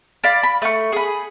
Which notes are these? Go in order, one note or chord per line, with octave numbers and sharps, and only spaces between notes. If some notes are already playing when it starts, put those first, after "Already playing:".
D5 F5 B5
B5
A3 C#6
G#4 B5